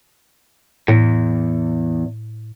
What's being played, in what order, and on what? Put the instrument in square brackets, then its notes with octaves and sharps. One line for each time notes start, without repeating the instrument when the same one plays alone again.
[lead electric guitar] E2 [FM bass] A2